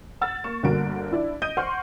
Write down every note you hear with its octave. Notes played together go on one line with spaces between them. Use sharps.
F#5 E6 F6 A6
A#3 C#6 E7
G1 D3 A#3 F#4 A#4 D7
D4 E4 D5
D#5 D#6 G6 A#6 D7 D#7
C5 F#5 C6 C#6 F6 G6